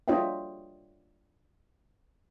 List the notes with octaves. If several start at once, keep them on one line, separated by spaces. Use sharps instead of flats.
D4 F4 C#5 D#5 E5 G5